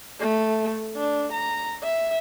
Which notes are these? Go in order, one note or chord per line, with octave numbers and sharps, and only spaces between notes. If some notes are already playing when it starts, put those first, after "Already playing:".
A3
D4
A#5
E5